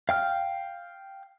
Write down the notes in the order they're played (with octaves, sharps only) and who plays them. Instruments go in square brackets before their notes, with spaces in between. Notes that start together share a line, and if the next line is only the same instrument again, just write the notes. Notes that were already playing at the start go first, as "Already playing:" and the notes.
[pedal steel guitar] F5 G5 F6